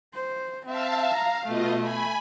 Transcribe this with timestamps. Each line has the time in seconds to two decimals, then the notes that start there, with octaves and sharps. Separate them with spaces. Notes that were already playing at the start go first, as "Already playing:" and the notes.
0.15 C5
0.66 C4 E5 F5 A5
1.14 F5 A#5
1.46 B2 A3 F4 D#5
1.80 G#5 B5